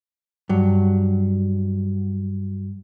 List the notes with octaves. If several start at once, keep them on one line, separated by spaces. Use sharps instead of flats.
G2 F#3